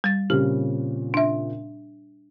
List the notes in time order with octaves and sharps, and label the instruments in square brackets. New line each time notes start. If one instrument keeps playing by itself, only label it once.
[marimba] G3 A6
[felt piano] A#2 C#3 C4 [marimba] G4
[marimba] D4 E5